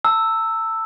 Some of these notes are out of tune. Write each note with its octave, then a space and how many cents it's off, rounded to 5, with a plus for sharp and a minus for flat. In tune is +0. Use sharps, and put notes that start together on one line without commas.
A5 +40 E6 +0